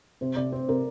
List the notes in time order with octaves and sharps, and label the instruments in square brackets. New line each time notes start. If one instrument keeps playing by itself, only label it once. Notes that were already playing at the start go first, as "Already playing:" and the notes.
[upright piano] C3 [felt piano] C5
[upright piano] C3 [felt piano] D5
[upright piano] C4 [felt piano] C5
[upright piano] C3 [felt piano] A#4